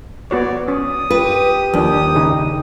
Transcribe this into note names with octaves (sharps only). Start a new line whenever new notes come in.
B3 F#4 C#5 D5
C#4 D#6
F4 G4 B4
D#2 F3 D4 D#6
C#3 D#4 G#4